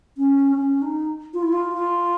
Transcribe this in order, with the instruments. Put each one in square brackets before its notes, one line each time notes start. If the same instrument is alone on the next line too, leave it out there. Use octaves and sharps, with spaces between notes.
[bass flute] C#4
C#4
D#4
F4
E4
F4
F4